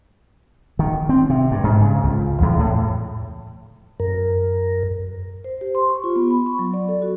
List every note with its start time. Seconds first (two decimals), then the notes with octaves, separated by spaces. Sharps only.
0.79 D#3
1.09 C4
1.30 C3
1.51 G2
1.64 G#2
1.81 C#3
2.03 C#2
2.42 E2
2.59 A2
4.00 F#2 A#4
5.44 C5
5.61 G4
5.75 C6
5.89 C#6
6.04 F4
6.16 B3
6.31 B5
6.46 C#6
6.59 F#3
6.74 D5
6.89 A4
7.02 F#4